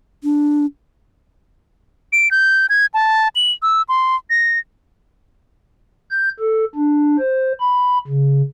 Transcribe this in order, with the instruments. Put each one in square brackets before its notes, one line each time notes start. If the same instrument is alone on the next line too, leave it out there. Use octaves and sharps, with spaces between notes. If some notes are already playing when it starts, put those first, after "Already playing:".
[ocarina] D4
[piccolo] D7
G6
G#6
A5
F#7
E6
C6
A#6
[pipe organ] G6
A4
D4
C5
B5
C#3